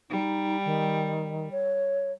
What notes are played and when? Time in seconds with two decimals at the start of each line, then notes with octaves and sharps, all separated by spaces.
0.10 G3 D#4
0.65 D#3
1.52 C#5